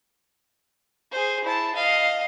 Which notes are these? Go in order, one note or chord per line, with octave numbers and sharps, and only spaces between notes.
G#4 C5
E4 A5
D#5 F5